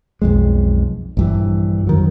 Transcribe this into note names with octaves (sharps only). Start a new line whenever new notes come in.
B1 F2 G#3
A#1 G2 E3
F2 D#3 F#3